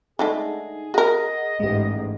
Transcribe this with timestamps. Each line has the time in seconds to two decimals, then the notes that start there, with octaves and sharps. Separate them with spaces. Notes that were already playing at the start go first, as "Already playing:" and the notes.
0.19 D3 G#3 A3 D#4 G#4
0.94 F#4 G#4 A#4 D#5 F#5
1.60 A1 G#2 G#3 G4